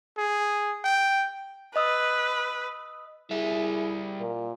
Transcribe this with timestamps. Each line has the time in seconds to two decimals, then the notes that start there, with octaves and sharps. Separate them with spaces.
0.18 G#4
0.84 G5
1.76 B4 D#5 D#6 E6
3.31 G3 E4 G#4 E5
4.20 A#2 A#4